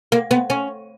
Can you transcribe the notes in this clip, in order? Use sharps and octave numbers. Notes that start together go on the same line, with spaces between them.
A#3
B3
C#4